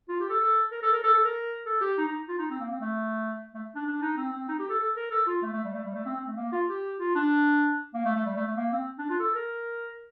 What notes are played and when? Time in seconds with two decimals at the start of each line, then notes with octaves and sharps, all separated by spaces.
0.09 F4
0.20 G4
0.30 A4
0.40 A4
0.72 A#4
0.83 A4
0.93 A#4
1.04 A4
1.14 A4
1.25 A#4
1.66 A4
1.81 G4
1.98 D#4
2.08 D#4
2.29 F4
2.39 D#4
2.51 C4
2.61 A#3
2.71 C4
2.81 A3
3.54 A3
3.75 D4
3.87 D4
4.02 D#4
4.17 C4
4.33 C4
4.49 D#4
4.60 G4
4.69 A4
4.80 A4
4.97 A#4
5.11 A4
5.27 F4
5.43 A3
5.54 A3
5.64 G3
5.74 A3
5.85 G3
5.95 A3
6.06 C4
6.17 C4
6.27 A3
6.37 A#3
6.53 F4
6.69 G4
7.00 F4
7.15 D4
7.94 A#3
8.05 A3
8.16 A3
8.26 G3
8.37 A3
8.47 A3
8.57 A#3
8.73 C4
8.99 D4
9.10 F4
9.20 A4
9.35 A#4